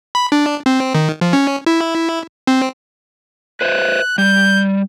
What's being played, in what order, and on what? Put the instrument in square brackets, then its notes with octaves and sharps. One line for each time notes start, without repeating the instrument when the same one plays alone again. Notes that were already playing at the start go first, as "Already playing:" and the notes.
[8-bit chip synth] B5
D4
C4
D#3
F3
C#4
E4
C4
[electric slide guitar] B4 C5 E5 [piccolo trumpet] F#6
[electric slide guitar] G3 [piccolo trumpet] G6